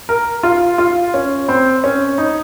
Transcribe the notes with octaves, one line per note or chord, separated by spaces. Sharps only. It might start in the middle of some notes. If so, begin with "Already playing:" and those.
A#4
F4
F4
C#4
C4
C#4
D#4